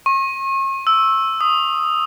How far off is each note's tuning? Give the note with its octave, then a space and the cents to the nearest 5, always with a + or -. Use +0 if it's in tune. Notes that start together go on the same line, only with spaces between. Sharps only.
C#6 -40
E6 -5
D#6 -5